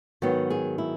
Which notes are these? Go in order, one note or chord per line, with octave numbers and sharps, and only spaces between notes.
G#2 D#3 F#3 B3 F#4
G#4
E4